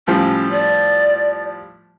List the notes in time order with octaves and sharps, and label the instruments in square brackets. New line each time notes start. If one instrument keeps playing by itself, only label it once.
[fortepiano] A2 F3 G3 [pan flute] C#4
[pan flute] D5